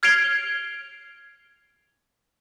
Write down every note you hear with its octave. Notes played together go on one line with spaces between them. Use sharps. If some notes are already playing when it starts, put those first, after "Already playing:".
F6 G#6 C7 D7 F7 G7